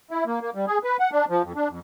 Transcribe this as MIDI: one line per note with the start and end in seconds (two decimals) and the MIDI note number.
0.11 0.24 64
0.26 0.39 58
0.41 0.50 58
0.55 0.65 55
0.67 0.78 68
0.84 0.97 71
1.00 1.10 78
1.12 1.25 62
1.30 1.42 53
1.43 1.53 41
1.56 1.69 62
1.69 1.79 41